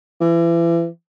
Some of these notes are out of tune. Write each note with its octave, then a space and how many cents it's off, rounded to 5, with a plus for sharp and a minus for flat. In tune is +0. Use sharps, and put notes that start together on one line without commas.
E3 +35